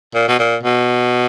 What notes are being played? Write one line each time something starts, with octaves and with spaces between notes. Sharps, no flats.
A#2
B2
A#2
B2